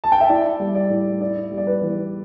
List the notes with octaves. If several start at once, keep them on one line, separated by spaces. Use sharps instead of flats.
A5
G5
E5
E4 D5
G3
D5
A2
E4 D5
G3
D5
B4
E3